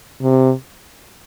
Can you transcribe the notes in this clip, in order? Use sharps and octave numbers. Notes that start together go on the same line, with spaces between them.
C3